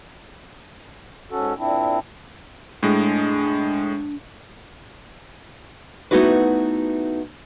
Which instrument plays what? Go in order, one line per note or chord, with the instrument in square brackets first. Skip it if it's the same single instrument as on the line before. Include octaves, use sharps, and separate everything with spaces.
[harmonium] G#2 C#4 F#4 A4
A#2 C4 D4 E4
[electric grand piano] A2 G#3 [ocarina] D4
[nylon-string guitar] A3 B3 D#4 E4 F#4 B4